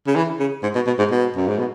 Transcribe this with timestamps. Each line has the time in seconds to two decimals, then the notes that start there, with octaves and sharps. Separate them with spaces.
0.07 C#3
0.15 E3
0.39 C#3
0.63 G#2
0.75 B2
0.87 B2
0.98 G#2
1.11 B2
1.36 F#2
1.47 G#2
1.58 B2